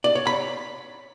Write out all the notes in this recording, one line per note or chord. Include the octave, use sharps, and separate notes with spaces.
D5
C#5
B5